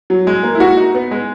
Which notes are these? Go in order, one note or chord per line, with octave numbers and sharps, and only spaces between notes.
F#3
G#3
A#3
E4
F#4
D#4
B3
G#3